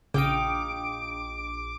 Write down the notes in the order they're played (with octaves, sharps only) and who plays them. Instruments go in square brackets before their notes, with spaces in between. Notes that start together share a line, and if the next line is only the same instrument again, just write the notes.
[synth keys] A#1 D7 [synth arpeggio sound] C#3 [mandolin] D#4 F5 G5 [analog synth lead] D6